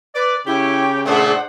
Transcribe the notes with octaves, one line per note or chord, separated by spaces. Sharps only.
B4 D5
C#3 E4 G4 C#5 G5
A#2 A3 D4 G#4 C5 F#5